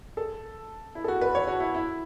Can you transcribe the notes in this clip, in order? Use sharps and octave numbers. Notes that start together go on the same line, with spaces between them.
A4
E4
A4
F#4
B4
C#5
F#4
E4
E4